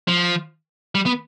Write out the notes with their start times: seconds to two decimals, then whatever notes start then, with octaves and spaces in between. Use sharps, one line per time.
0.08 F3
0.95 G3
1.06 B3